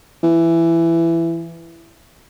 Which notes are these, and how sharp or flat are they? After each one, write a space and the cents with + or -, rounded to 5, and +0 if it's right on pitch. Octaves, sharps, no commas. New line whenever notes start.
E3 +15